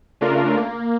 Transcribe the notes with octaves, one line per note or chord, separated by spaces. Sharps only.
C#3 A3 D4 F4 A#4
A#3